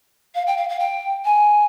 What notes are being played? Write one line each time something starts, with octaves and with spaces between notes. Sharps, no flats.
F5
G5
F5
F5
G5
G#5